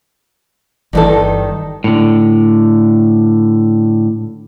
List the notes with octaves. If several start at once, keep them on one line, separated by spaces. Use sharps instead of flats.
G1 G2 D#3 E3 A4
A2 D3